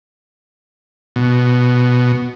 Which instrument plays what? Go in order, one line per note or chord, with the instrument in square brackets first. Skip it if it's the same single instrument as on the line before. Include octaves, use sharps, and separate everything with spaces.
[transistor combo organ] B2